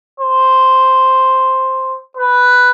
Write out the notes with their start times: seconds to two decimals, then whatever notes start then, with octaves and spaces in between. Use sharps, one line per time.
0.20 C5
2.17 B4